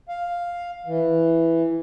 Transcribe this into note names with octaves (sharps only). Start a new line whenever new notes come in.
F5
E3